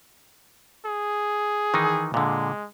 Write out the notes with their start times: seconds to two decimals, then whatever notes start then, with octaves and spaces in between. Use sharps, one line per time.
0.85 G#4
1.74 D#3 E3 D#4
2.14 A#2 D3 G#3